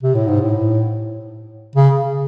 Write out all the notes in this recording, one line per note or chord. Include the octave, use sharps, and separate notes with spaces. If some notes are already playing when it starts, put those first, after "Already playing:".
C3
A2
G#2
A2
C#3